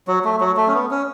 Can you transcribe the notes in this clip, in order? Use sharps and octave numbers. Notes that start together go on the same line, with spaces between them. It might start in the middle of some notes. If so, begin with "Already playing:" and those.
F#3
A3
F#3
A3
C#4
B3
C#4